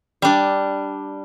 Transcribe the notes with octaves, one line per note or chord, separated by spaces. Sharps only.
G3 D4